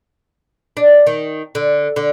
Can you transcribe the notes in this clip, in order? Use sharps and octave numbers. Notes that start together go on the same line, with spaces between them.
D4
D#3
D3
D3